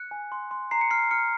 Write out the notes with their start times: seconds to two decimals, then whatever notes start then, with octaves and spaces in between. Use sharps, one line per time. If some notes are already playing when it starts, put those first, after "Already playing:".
Already playing: F#6 C#7
0.11 G#5
0.32 C6
0.51 C6
0.71 A#5 C7
0.81 C#7
0.91 F6 C7
1.11 F6 C#7